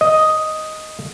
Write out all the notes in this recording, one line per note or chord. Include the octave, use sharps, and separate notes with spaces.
D#5